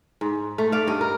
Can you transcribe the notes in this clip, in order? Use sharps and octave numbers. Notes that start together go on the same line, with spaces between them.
G#2
A3
D5 F5
G2 D#5
A#4